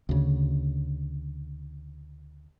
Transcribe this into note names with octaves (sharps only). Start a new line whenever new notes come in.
D2 C#3